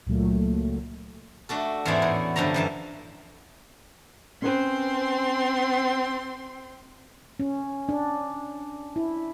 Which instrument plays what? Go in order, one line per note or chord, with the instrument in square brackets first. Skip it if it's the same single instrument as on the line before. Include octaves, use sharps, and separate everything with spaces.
[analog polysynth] C#2 A#2 F#3 A3
[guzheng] A3 D4 F#4 A4
E2 G#2 E3 C#4 D4 E4
A2
G2 D3 F3 A3 A#5
F#2 E3 A5
[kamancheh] C4 C6 [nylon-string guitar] C#4 B4 C5
[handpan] C#4
D4
E4